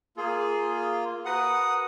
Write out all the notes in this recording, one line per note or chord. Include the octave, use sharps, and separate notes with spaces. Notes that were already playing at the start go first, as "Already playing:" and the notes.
A#3 F4 G#4
F#4 A#4 B4 F#5 D#6